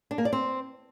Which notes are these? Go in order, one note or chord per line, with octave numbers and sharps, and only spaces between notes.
D4
A#3
D5
C4